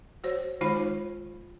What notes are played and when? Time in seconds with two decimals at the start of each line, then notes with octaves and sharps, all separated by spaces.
0.24 F#4 C5 C#5
0.61 D#3 G#3 D#4 F4 C5 B5